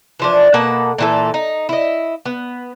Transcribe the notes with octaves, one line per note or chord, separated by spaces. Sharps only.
E3 F3 D4
B2 A#3 A4 F#5
A#2 E3 A4
D#4
E4 D#5
B3